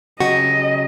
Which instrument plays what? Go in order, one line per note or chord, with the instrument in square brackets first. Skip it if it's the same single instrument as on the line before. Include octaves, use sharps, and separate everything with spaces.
[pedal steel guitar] C#3 F#3 G4 [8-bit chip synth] F#4 [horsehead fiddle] D#5